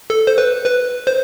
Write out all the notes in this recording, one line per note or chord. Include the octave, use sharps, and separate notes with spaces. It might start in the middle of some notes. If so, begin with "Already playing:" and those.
A4
C5
B4
B4
C5